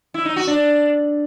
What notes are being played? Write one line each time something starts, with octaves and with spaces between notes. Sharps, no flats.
E4
D#4
F#4
D4